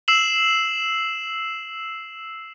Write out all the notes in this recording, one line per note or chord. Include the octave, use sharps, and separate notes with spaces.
E6 C7 E7 F#7